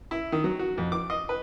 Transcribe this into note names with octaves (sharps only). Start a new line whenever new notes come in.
E4
D#3
F#3
F#4
F2
D6
D#5
B4